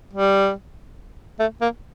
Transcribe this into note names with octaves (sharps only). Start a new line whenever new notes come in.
G3
A3
A#3